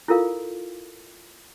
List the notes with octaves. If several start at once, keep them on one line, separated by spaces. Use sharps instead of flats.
E4 F4 A4 A#4 F5